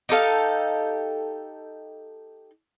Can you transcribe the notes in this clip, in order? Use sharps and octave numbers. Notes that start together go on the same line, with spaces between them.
D#4 G4 A4 F5